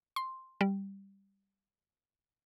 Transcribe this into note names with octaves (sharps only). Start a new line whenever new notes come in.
C6
G3